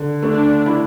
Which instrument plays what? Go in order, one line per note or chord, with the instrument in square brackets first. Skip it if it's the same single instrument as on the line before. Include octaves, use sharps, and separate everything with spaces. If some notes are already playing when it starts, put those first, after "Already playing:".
Already playing: [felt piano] D3
[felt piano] A3 [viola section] D4
[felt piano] E4